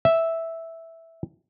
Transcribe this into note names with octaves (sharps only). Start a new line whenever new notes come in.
E5